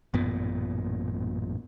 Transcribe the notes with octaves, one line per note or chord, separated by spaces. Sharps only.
A1 F#2 A#2 B3